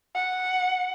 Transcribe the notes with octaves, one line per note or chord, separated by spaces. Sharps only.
F#5